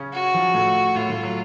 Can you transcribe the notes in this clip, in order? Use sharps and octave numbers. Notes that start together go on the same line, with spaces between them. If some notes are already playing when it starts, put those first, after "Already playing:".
Already playing: C#3 C#4
F#4
F3
A2 A3
A2 A3 F4
A2 A3
F#3